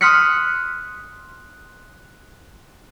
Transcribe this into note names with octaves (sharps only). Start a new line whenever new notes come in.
C6 D#6 F6 F#6 B6 C#7